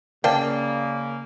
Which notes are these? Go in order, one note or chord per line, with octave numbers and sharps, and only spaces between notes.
C#3 A#3 A#4 D5 F5 G5 A5